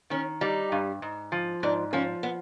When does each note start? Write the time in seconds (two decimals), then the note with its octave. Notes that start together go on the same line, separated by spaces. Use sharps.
0.10 D#3 C#4
0.41 G3 D#4
0.72 G2
1.02 G#2
1.32 F3
1.63 G#2 D4
1.93 F3 C#4
2.23 B3